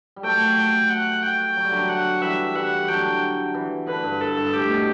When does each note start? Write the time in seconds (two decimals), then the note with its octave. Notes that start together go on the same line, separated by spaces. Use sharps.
0.16 G3
0.23 F#3 A3 G5
0.90 F#5
1.23 G5
1.56 F#3
1.64 G3
1.72 D3 F#3
1.89 F#5
2.21 E3 G3 E5
2.55 E3 G3 F#5
2.88 D3 F#3 G5
3.54 E3
3.87 D3 B4
4.04 G2
4.21 A4
4.37 G2
4.53 A2 G4
4.70 B2